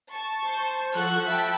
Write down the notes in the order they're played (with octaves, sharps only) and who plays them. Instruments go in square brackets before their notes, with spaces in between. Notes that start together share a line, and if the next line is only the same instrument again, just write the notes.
[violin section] A5 C#6
[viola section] C5
[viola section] F3 A4 [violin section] F#5 C#6 F#6
[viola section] E5 G5 [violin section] A5 B5